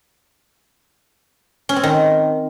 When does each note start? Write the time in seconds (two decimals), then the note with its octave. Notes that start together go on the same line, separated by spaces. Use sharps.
1.69 C#4
1.76 C4
1.83 D#3